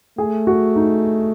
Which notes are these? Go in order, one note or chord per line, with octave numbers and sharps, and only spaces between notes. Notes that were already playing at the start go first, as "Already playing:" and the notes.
A3 G#4
F#4
D#4